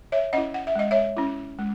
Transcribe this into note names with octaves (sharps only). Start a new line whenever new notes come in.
C#5 E5
C#4 E4 D#5 F#5
F#5
E5
G#3 D#5
C#5 E5
C#4 E4
G#3